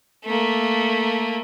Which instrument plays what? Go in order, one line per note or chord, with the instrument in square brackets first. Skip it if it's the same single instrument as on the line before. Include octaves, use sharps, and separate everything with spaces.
[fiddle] A3 A#3